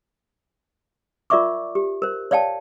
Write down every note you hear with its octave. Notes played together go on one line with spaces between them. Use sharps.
F4 A#4 D5 E5 C#6 D6
G4
A#4 C5
C#5 D5 F5 G5 A5